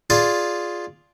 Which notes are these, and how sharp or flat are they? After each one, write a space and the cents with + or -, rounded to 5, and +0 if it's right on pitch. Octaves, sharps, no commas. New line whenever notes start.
F4 +5 G#4 +0 D5 +0